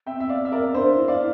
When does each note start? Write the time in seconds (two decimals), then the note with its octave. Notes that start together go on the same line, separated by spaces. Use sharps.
0.07 C4 E5 G5
0.20 E5
0.29 D5 F5
0.45 E5
0.52 A#4 D5
0.74 D4 C5 E5
0.97 E4
1.08 D5 F5